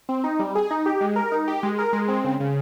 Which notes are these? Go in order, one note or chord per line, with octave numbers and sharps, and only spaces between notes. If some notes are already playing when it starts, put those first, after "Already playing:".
C4
D#4
G3
G#4
D#4
G4
G#3
A#4
D#4
G4
G#3
A#4
G#3
C4
C#3
C#3